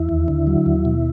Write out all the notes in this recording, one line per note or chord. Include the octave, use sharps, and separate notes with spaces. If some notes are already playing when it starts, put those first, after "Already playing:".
Already playing: E2 E4
D#2
D3
F#3
D#2
B2